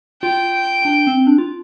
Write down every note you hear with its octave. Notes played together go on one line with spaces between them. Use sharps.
F4 G5
D4
C4
D4
F4